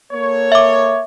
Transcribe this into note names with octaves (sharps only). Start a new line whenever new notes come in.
A#3 A4 C#5
E5 D6